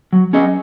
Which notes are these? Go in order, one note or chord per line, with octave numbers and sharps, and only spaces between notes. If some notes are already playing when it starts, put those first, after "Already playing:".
F#3
C#4 G#4 D#5